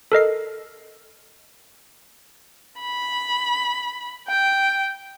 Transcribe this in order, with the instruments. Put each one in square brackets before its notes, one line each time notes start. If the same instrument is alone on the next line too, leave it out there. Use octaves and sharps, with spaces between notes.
[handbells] A4 A#4 D#5 C7
[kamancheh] B5
G5